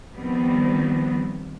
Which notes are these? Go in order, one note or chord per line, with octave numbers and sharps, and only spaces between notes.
D#3 F3 G3 B3 C4